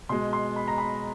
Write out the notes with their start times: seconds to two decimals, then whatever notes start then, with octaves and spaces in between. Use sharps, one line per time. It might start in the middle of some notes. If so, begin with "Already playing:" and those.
0.09 B2 G#3 C6
0.33 C6
0.56 B5
0.68 A#5
0.78 B5